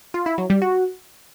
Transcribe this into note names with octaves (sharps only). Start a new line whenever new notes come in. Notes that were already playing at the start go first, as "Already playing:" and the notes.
F4
E4
F#3
G3
F#4